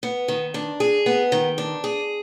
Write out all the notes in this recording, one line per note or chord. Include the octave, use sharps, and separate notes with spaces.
B3
D#3
D4
G#4
B3
D#3
D4
G#4